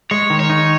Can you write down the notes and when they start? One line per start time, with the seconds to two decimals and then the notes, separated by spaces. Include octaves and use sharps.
0.11 G#3 C#5
0.30 D#3
0.40 C#5
0.50 D#4